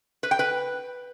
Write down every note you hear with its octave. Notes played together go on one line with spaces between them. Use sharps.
B4
G5
B4